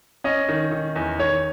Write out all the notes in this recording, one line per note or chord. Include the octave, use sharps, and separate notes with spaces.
C#4 D#5
D#3
D#3
E2
D#3 C#5